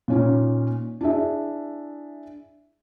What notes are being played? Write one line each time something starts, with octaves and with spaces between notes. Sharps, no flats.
A#2 C#4 D#4
D4 E4 G#4 E5